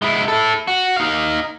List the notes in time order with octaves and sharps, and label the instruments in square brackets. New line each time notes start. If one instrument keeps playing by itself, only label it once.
[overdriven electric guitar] G#3 E4
E4 A4
F#4
D#4 F5